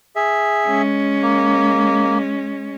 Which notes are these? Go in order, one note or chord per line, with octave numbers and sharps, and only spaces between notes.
G#4 E5
G#3 C#4
A#3